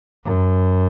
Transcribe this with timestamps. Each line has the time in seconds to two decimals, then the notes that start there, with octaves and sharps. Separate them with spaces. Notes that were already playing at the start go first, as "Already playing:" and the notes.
0.25 F#2